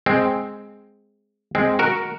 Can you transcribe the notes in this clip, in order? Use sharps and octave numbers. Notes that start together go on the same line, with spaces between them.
G#3 C4
G#3 C4
F#4 A#4